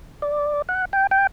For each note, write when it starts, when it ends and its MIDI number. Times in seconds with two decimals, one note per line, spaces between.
0.22 0.62 74
0.69 0.85 78
0.93 1.07 79
1.11 1.27 79